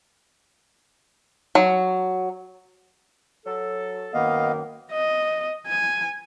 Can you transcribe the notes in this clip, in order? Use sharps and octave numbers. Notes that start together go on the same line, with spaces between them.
F#3
F#3 A4
F#2 D#3 A#3 B3 D#5 F5
D#5
G#5